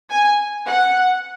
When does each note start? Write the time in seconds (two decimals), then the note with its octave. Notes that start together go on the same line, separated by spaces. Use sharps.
0.11 G#5
0.67 F#5